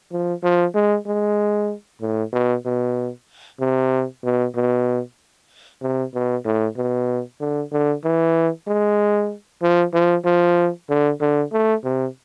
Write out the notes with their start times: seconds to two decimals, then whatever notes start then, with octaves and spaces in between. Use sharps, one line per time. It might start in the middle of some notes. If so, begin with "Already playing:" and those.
0.12 F3
0.43 F3
0.75 G#3
1.07 G#3
2.01 A2
2.33 B2
2.65 B2
3.60 C3
4.24 B2
4.56 B2
5.82 C3
6.14 B2
6.45 A2
6.77 B2
7.40 D3
7.72 D3
8.04 E3
8.67 G#3
9.62 F3
9.94 F3
10.25 F3
10.89 D3
11.21 D3
11.52 A3
11.84 C3